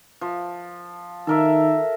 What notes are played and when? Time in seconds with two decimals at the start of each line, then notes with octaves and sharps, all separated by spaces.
0.21 F3
1.27 D#3 A4 A#4 E5